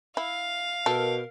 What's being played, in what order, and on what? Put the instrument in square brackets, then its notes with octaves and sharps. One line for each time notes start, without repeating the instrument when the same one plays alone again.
[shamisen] E4 [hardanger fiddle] F5
[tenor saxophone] B2 [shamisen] A4 [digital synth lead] A#4